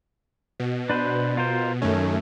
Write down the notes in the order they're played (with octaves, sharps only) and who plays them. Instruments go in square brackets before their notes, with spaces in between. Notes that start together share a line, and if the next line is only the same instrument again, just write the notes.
[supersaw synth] B2
[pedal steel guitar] D4 B4 C5
F4 A#4 C5
[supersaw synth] F#2 A3 [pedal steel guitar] D#3 C#4